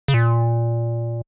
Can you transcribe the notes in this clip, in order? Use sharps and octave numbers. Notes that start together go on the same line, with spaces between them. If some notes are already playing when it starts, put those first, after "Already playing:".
C#3
A#2